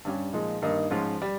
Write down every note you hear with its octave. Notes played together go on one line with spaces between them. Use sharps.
G2 G3 C#4 G4
A#2 F3 G#3 D#4
G2 D#3 A#3 D#4
G#2 F3 G#3 C#4 F4
G3